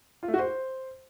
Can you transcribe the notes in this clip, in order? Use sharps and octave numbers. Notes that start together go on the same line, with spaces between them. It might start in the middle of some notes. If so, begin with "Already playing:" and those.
F4
A3
F#4
C5